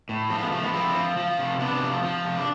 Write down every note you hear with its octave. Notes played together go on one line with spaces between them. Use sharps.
A2
F3 A3 C4
G#3 B3
F3 A3
G#3 B3
F3 C4 E4
F3
F3
C3
C3 B3 D4
F3
F3
C3
D4